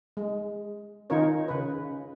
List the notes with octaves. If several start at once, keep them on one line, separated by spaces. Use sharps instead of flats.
G#3
D#3 C#4 D#4 F4 A#4 C#5
C#3 B4